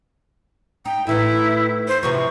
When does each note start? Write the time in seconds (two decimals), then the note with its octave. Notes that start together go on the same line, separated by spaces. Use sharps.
0.85 D#4 G5
1.07 A2 E3 D#4 E4
1.88 C5
2.03 C3 E3 F3 C#6